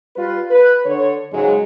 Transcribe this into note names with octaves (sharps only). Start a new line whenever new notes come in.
G3 F4 B4
B4
D3 C#5
G#2 C#3 F#3 G#3